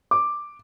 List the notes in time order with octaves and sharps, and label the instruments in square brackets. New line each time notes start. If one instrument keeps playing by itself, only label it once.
[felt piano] D6